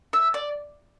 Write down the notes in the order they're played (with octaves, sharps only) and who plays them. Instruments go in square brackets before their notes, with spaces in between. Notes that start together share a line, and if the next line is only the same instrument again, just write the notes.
[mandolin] E5
D5